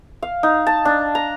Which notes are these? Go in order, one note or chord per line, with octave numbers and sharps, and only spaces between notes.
F5
D#4
A5
D4
A#5